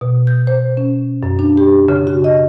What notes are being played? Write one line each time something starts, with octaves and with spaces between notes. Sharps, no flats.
B2
G6
C5
C#4
F#2
D4
G4
C#3
F#4
D#5